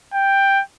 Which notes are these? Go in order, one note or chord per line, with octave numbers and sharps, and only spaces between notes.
G5